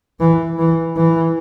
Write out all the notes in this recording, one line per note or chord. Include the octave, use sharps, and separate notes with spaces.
E3
E3
E3